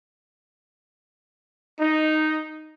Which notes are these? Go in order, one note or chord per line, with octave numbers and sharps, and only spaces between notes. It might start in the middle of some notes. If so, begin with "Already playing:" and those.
D#4